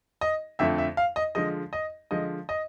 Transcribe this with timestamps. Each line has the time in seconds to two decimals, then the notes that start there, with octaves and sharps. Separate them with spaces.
0.21 D#5
0.59 F2 D3 F3 A3 E5
0.78 E5
0.97 F5
1.16 D#5
1.35 D3 F3 G#3 D#5
1.73 D#5
2.11 D3 F3 G#3 D#5
2.49 D#5